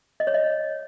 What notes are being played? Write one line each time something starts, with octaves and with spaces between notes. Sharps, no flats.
D#5
C#5
D#5